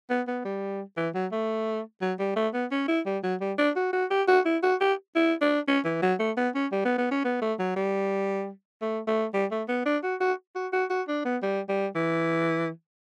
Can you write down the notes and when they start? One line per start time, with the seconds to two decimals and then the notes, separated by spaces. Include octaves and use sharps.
0.10 B3
0.27 B3
0.45 G3
0.97 E3
1.14 F#3
1.32 A3
2.01 F#3
2.19 G3
2.36 A3
2.53 B3
2.71 C#4
2.88 E4
3.06 G3
3.23 F#3
3.41 G3
3.58 D4
3.76 F#4
3.93 F#4
4.10 G4
4.28 F#4
4.45 E4
4.63 F#4
4.81 G4
5.15 E4
5.41 D4
5.67 C#4
5.85 E3
6.02 F#3
6.19 A3
6.37 B3
6.55 C#4
6.72 G3
6.85 B3
6.98 B3
7.11 C#4
7.24 B3
7.41 A3
7.59 F#3
7.76 G3
8.82 A3
9.07 A3
9.34 G3
9.51 A3
9.68 B3
9.86 D4
10.03 F#4
10.20 F#4
10.55 F#4
10.73 F#4
10.90 F#4
11.08 D4
11.25 B3
11.43 G3
11.69 G3
11.95 E3